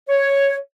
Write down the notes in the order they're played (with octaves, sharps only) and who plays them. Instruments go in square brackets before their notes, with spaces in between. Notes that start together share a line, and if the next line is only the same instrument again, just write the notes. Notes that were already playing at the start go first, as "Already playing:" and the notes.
[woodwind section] C#5